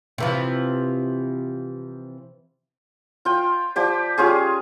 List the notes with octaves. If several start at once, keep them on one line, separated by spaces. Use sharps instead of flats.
C3 E3 F3
F4 G5
F3 G4 D5
G3 C#4 F4 G#4